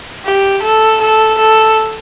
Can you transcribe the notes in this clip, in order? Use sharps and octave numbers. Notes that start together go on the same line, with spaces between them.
G4
A4
A4
A4